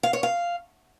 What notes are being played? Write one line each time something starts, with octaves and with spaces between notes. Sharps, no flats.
F5
C#5
F5